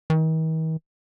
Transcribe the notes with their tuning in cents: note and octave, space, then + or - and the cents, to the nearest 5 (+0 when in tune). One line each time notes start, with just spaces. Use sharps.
D#3 +45